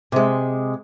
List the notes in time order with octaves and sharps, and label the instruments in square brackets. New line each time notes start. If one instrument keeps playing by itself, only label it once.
[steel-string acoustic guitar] C3 G#3